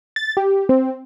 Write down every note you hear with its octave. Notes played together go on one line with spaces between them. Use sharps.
A6
G4
C4